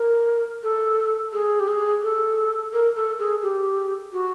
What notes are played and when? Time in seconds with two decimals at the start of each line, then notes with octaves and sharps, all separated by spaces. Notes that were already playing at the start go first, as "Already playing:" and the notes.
Already playing: A#4
0.63 A4
1.33 G#4
1.60 G4
1.68 G#4
2.03 A4
2.73 A#4
2.96 A4
3.19 G#4
3.43 G4
4.13 F#4